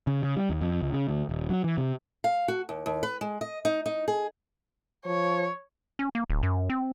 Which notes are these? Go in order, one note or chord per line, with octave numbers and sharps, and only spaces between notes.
C#3
C#3
G3
D#2
F2
C#2
C#3
D2
D#1
F#3
E3
C3
F5
F#4
D#2
D#2
B4
G#3
D#5
D#4
D#4
G#4
F3 C#5
C#4
A#3
D1
F#2
C4